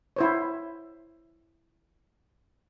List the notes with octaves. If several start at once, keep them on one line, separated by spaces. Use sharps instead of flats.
E4 C5 C#5